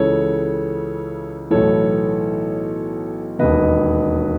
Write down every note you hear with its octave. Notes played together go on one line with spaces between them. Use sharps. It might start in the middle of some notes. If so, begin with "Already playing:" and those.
Already playing: C#2 C#3 E3 A4 C#5
B1 A2 E3 A4 C#5
E1 D#2 D#3 B4 D#5